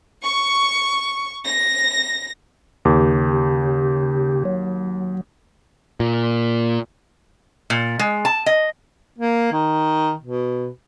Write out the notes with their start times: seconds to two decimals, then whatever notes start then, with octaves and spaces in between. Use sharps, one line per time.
0.24 C#6
1.46 A#6
2.85 D#2 C#3 G4
4.45 F#3
6.00 A#2
7.70 A#2
7.99 G#3
8.25 A5
8.46 D#5
9.18 A#3
9.52 D#3
10.23 B2